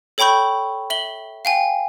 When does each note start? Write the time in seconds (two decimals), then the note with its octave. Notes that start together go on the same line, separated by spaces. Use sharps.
0.18 A4 C#5 G5 B5 C#6 G6
0.90 E5 F#7 G7
1.45 F5 G5 G#5